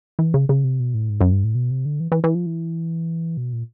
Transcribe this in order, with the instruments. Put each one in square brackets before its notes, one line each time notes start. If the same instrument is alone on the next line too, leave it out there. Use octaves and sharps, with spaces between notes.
[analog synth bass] E3
C#3
C#3
C3
B2
A2
G#2
F#2
G2
A2
B2
C3
D3
E3
E3
E3
F3
E3
B2
A#2